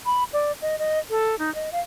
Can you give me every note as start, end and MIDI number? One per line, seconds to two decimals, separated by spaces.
0.06 0.24 83
0.33 0.52 74
0.62 0.79 75
0.79 0.99 75
1.10 1.35 69
1.39 1.53 63
1.55 1.70 75
1.72 1.80 77